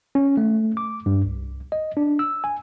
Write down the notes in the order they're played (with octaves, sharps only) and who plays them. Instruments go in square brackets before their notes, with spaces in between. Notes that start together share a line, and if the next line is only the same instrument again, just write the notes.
[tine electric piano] C#4
A3
D6
G2
C2
D#5
D4
E6
G#5